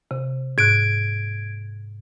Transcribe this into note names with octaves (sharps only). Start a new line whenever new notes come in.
C3
G#2 F#6 G#6 D7